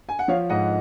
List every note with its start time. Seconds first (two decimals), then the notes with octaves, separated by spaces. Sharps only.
0.09 G#5
0.19 F#5
0.28 F3 C#5 F5
0.50 G#2 D#5 F#5